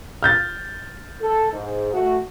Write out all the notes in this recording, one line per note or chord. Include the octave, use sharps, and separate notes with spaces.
F6 G6 A6
A4
G#2
A3 F#4